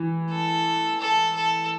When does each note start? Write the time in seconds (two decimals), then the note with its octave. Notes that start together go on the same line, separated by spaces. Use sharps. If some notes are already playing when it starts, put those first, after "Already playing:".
Already playing: E3
0.31 A4
1.01 A4
1.35 A4